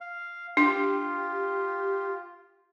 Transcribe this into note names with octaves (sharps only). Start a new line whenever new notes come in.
F5
D4 F4 G4